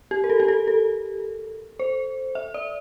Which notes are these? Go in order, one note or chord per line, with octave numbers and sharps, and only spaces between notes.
G4
A#4
A4
G4
A4
A4
C5
E5
D5